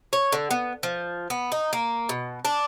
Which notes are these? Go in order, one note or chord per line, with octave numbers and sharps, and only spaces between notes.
C#5
D3
B3
F3
B3
D#4
A#3
B2
D4